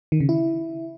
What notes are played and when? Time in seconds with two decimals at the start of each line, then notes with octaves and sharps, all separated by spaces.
0.12 D#3
0.20 C#3
0.29 E4